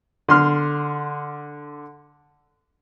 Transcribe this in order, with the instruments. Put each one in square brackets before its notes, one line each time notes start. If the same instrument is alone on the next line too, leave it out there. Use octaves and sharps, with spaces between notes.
[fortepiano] D3 C6 F6